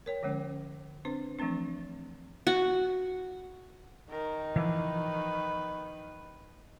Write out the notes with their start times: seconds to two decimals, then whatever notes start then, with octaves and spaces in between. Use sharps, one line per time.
0.06 A#4 C#5 G5
0.23 D3 F3 G#3 C#4
1.05 C4 D4 B4 C5
1.39 E3 F3 A3 C4 D4
2.47 F#4
4.10 D#3 A#4
4.56 E3 F3 B4